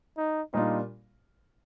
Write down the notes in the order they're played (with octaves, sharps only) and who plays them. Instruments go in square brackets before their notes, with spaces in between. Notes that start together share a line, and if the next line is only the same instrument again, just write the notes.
[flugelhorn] D#4
[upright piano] A#2 G3 D4 F4 [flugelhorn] D#4